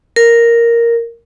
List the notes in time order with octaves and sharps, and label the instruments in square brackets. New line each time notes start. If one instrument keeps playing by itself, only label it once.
[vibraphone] A#4